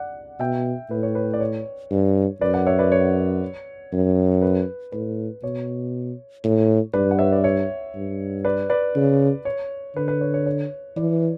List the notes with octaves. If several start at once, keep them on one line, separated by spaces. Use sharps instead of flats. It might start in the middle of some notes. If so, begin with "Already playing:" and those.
Already playing: D5 F#5
B2 E5 G5
A2 B4
C#5
B4
D5
C#5
G2
F#2 B4 D5
D5 F#5
C#5 E5
B4 D5
C#5
F#2
B4
A2 B4
B2 C#5
A2
G2 B4 D5
F#5
C#5 E5
B4 D5
C#5 E5
G2
B4 D5
B4 D5
C#3
C#5
D3 B4
B4
C#5
C#5
C#5
E3 B4 D5